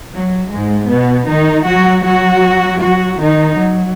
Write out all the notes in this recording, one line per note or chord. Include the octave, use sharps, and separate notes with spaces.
F#3
G#2 G#3
B2 B3
D#3 D#4
F#3 F#4
F#3 F#4
F#3 F#4
D#3 D#4
F#3